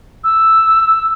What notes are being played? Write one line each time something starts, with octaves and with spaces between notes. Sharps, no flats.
E6